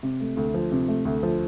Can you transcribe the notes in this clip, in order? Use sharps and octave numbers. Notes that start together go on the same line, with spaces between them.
C3
A3
D2
F3
C3
A3
D2
F3